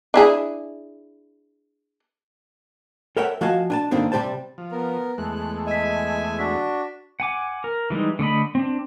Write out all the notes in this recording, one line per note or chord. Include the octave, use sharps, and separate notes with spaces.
D4 E4 G#4
A4 A#4 C#5 E5 F#5 G5
F3 F#4 D#5 F5 G#5 A5
D4 G#5 A5
G2 D3 D#3 A#3 C4 D4
C3 G3 G4 C5 A5
F3
B3 A#4
E2 G#3 A3 F#6
D#5 E5 G#5 B6
D4 F#4 B6
F#5 G#5 D6
A#4
E3 G3 G#3 D#4
D3 A3 D#5 B5
C4 D4